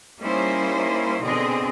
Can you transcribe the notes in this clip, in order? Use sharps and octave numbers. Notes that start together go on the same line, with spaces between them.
G3 A#3 C#4 D#4 E4 C5
B2 D3 C4 G#4 D#5